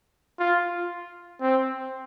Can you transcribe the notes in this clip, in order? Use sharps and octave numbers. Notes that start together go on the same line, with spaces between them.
F4
C4